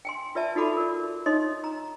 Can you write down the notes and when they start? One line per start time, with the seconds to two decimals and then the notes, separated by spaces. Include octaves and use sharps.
0.05 G5 G#5 C6
0.35 F4 B4 D5 E5 A5
0.55 D#4 F4 F#4 A4 B5 D6
0.77 A#4 D5
1.26 D#4 C#5 D#5 C6 D#6
1.64 A#5